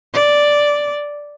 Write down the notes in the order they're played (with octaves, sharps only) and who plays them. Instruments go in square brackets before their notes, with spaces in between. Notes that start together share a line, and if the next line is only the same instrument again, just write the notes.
[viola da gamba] D5